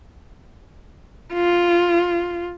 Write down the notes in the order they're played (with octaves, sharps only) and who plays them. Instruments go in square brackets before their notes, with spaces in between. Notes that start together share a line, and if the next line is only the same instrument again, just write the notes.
[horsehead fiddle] F4